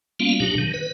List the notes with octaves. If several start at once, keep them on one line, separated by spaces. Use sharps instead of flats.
G3 A#3 B3 C#4 F4 F5
B2 F#3 D4 G4
D#3
B4